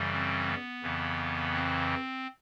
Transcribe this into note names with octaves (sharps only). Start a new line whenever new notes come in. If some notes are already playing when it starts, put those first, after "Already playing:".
Already playing: F#2 C#3 E3 G3
C4
B3
F2 C#3 E3
C4